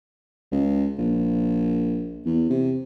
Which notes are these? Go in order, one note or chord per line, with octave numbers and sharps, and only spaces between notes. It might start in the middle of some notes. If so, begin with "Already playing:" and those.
C#2
A#1
E2
C3